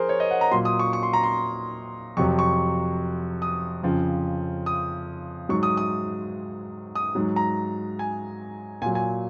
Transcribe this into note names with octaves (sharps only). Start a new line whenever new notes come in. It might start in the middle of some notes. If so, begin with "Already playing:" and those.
Already playing: F3 G#4 A#4 C5
C#5
D#5
F#5
A#5
A#2 F#3 C6
D#6
C#6
C#6
C6
A#5
C6
F2 C3 F#3 C#6
C#6
D#6
F2 C#3 F3
D#6
G#2 F#3 C#6
D#6
D#6
D#6
G#2 F#3
A#5
G#5
A#2 F#3 G#5
G#5